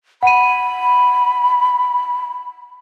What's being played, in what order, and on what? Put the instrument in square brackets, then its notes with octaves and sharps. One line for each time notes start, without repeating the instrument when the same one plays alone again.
[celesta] F#5 D#7 [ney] B5